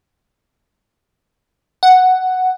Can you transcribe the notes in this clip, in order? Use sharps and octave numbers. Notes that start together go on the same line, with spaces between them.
F#5